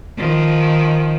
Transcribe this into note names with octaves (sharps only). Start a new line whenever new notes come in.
D#3 F3